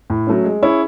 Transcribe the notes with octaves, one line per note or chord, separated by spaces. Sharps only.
A2
F#3 A3 C#4
G#3
C#4 E4 G#4 C#5